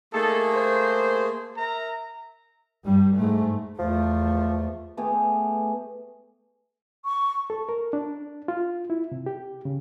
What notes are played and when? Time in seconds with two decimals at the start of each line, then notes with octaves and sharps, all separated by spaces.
0.13 A3 A#3 D#4 G#4 A4
0.54 C5
1.56 A#4 E5 A#5
2.85 G2 G3
3.15 G#2 A3
3.79 E2 F3 A3
4.97 A3 B3 G4 G#4
7.05 C#6
7.50 A4
7.69 A#4
7.93 D4
8.48 F4
8.90 E4
9.12 C3
9.26 G4
9.65 C#3